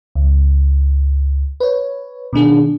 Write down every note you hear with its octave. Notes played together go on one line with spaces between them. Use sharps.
C#2
B4 C#5
B2 D#3 D4 G#4